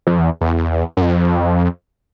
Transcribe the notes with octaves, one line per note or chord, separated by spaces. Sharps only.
F2
E2
E2
F#2
F2